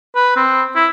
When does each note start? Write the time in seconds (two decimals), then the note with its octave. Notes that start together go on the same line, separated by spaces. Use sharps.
0.16 B4
0.36 C4
0.76 E4